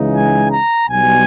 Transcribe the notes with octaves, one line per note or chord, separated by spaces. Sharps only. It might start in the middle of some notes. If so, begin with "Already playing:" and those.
Already playing: C#2 C#3 E3 G#3 D#4
G#5
A#5
B1 B2 G3 G#5